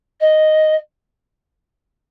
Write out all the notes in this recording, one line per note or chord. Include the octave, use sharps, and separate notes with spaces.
D#5